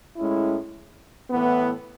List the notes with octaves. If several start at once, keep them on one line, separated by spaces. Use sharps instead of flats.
A2 G#3 C#4 E4
A2 E3 B3